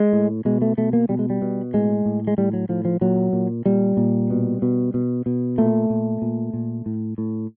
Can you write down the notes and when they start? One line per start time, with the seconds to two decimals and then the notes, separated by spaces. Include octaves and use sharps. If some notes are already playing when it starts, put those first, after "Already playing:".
Already playing: G#3
0.13 A2
0.45 B2 G#3
0.62 A3
0.78 B2 A3
0.93 A#3
1.09 B2 G3
1.19 G#3
1.30 G3
1.42 B2
1.74 A2 G#3
2.05 A2
2.27 G#3
2.38 A2 G3
2.53 F#3
2.69 A2 F3
2.85 F3
3.01 A#2 F#3
3.33 A#2
3.66 A#2 G3
3.97 A#2
4.30 B2
4.62 B2
4.94 B2
5.26 B2
5.58 A#2 A3
5.90 A#2
6.22 A#2
6.53 A#2
6.86 A2
7.18 A2